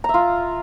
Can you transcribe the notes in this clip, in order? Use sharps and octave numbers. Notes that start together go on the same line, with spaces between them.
F4 E5 A#5